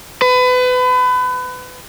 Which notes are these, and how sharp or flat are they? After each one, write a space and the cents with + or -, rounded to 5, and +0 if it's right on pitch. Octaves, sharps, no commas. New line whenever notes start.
B4 +30